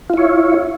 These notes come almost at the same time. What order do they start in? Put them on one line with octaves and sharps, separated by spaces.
F4 E4 C#5